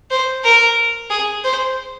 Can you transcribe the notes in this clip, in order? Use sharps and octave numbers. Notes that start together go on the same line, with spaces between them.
C5
A#4
G#4
C5